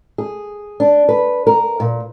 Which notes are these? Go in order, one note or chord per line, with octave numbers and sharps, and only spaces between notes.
G#4
D4
B4
A#4
A#2